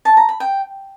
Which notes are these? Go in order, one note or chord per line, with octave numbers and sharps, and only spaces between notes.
A5
A#5
B5
G5